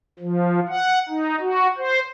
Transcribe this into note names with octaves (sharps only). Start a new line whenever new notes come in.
F3
F#5
D#4
F#4
C5